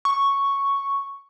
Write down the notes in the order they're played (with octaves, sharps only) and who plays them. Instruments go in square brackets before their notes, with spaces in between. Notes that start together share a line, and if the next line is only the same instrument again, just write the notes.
[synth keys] C#6